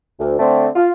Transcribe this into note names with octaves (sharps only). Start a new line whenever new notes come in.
D2
D3 A3 C4
F4